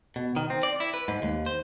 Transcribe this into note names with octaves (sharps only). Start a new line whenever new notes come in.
B2
D#3
C4
D5
E4
B4
G#2
D#2
C5